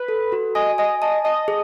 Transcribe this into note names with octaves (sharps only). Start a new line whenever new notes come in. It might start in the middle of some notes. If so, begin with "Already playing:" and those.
Already playing: B4
A4
F#4
D#5 G#5
D#5 G#5
D#5 A5
D#5 A5
G#4